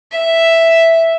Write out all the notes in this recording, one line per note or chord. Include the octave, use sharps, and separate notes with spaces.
E5